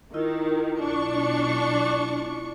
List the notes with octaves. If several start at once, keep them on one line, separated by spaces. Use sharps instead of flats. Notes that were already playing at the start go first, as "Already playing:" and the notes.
D#3 E4 F4 D#5
B1 D4 C#6